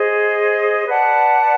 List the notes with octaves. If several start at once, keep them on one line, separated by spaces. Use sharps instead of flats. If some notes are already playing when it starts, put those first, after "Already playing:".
Already playing: G#4 C5 D#5
B4 D5 F#5 A5